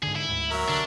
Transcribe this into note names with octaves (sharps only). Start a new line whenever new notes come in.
G#2 D3 G#4
E4
D2 G#2
F#3 A#4 E5
C2 D3 D4